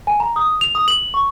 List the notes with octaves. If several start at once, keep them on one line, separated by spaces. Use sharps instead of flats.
G#5
A#5
D#6
F7
D#6
F#7
C#6